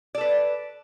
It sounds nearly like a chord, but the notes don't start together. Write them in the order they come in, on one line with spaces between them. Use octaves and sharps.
D5 A4 B4